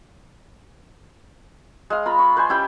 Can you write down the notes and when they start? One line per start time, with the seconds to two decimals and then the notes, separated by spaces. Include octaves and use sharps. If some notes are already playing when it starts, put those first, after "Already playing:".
1.90 G#3 F5
2.06 F4 A#5 B5
2.19 C#6
2.37 B4 C5 G#5
2.49 C#4 E4 G4 G5